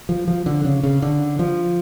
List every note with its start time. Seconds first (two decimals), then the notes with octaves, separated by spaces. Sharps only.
0.09 F3
0.28 F3
0.46 D3
0.65 C#3
0.83 C#3
1.02 D3
1.39 F3